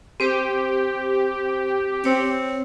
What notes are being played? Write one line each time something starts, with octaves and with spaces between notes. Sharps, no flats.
C4 G4 C5
C4 C#5